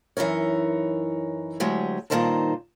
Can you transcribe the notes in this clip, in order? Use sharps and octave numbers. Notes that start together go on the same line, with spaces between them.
F#2 E3 D#4 A#4 C#5
D2 F#3 G#3 G4 G#4
G2 A#2 D#3 D#4 C5 A5